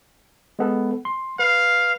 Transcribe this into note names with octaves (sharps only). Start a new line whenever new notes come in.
G#3 B3 A4
C6
B4 F5